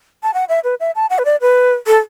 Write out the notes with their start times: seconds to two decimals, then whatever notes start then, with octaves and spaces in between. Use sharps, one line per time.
0.23 A5
0.34 F#5
0.49 E5
0.64 B4
0.80 E5
0.95 A5
1.10 F#5
1.18 B4
1.25 D5
1.41 B4
1.87 A4